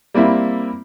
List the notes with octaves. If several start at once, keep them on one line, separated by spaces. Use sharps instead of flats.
G3 A#3 C4 E4